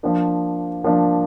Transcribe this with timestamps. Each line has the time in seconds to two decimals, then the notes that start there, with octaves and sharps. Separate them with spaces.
0.03 F3 A#3 D4
0.84 F3 A#3 D4